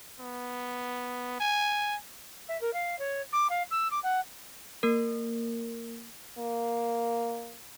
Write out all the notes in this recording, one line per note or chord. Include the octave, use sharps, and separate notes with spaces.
B3
G#5
E5
A#4
F5
C#5
D6
F5
E6
D6
F#5
A#3 A#4
A#3